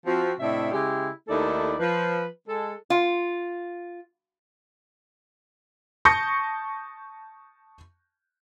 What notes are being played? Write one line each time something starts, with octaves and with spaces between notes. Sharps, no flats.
F3 C4 F#4
A2 C3 D4 D#5 E5
C#3 G#3 E4 G4
D#2 A3 D#4 E4 A4 D5
F3 B4
G#3 A4
F4
A5 C#6 D#6 G6 A#6 C#7